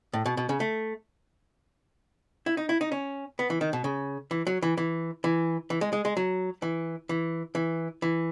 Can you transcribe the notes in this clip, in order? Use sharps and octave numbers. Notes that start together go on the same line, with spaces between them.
A2
B2
B2
C#3
A3
E4
D#4
E4
D#4
C#4
B3
E3
D#3
B2
C#3
E3
F#3
E3
E3
E3
E3
G#3
G#3
G#3
F#3
E3
E3
E3
E3